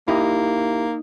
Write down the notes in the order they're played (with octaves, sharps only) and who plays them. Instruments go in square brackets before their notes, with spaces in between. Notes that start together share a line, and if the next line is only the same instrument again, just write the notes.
[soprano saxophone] A#3 [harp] D#4 [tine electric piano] E4 G4